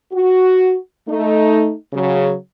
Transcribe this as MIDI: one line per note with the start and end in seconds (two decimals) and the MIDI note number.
0.12 0.75 66
1.06 1.72 57
1.06 1.72 63
1.93 2.33 49
1.93 2.33 54